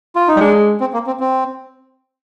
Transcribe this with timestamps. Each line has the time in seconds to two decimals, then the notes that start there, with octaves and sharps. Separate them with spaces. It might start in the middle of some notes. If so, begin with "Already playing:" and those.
0.16 F4
0.28 D#4
0.36 G3
0.41 G#3 D4
0.80 C4
0.93 A#3
1.07 C4
1.20 C4